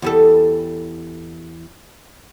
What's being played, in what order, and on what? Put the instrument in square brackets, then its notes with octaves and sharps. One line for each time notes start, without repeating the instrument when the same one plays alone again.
[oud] E2 G3 A4